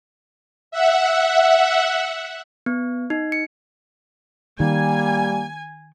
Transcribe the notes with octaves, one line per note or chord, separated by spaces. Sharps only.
E5 F#5
B3
D#4
C#7
D#3 G3 A#3 G#5